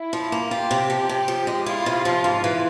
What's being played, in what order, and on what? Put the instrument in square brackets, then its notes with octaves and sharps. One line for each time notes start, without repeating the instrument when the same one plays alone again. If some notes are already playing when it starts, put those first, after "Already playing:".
Already playing: [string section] E4
[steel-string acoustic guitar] F3
A#3
[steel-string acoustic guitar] F4 [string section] G4
[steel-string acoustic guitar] C3
F3
C3
F3
G#3
[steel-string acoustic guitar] E4 [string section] F4
[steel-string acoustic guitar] C3
F3
G#2
E3